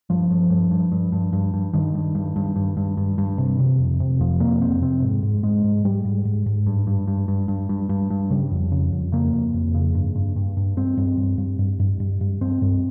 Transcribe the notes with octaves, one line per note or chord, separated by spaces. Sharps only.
G2 F3
G2
G2
G2
G2
G2
G2
G2
G2 D#3
G2
G2
G2
G2
G2
G2
G2
C3
C3
F2
C3
F2 F3
C3 A#3
F2 C4
C3 C4
G#2
G#2
G#2 G#3
G#2
G#2 G3
G#2
G#2
G#2
G2
G2
G2
G2
G2
G2
G2
G2
C#3 G3
F2
C#3
F2
C#3 A#3
F2
F2
C#3
G2
G2
G2
G2
G2 C4
G2
G2
G2
G2
G2
G2
G2
G2 C4
G2